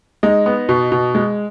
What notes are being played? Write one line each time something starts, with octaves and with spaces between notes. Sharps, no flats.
G#3 D#4 D#5
B3
B2
B2
G#3